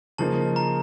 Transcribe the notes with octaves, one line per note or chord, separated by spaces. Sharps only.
C#3 F3 A#3 D#4 A5
A#5